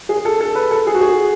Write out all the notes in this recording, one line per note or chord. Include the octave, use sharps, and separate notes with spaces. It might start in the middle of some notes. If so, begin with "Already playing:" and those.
G#4
A4
A4
B4
A4
G#4
F#4
G#4